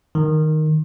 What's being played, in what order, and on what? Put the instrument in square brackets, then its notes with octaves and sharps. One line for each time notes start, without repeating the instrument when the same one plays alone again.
[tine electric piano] D#3